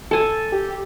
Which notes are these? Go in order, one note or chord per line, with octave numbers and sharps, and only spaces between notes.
A4 G#5
G4